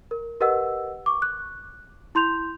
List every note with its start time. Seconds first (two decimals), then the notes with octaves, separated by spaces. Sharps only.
0.11 A#4
0.40 G4 A#4 B4 D#5 F#5 E6
1.06 C#6 D6
1.22 F#6
2.15 E4 C6 G6 F7